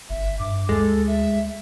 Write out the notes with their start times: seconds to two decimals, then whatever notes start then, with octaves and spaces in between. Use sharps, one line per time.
0.10 G1 E5
0.39 G2 D6
0.69 D2 G#3 A4
1.07 E5